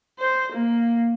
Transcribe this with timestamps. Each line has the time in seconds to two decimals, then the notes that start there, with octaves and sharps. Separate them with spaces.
0.19 C5
0.53 A#3